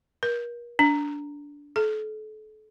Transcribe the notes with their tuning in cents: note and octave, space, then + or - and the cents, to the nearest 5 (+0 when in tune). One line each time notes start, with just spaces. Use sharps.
A#4 +40
D4 -15
A4 -35